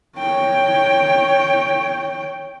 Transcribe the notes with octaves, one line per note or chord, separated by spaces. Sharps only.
C#5 G5